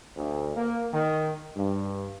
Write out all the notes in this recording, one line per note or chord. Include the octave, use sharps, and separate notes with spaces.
D2
A#3
D#3
G2